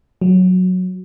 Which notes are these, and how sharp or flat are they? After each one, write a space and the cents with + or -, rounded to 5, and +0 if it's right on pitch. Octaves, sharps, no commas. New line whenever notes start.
F#3 -10